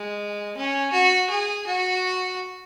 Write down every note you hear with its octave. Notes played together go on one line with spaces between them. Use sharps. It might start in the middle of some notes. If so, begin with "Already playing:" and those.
Already playing: G#3
C#4
F#4
G#4
F#4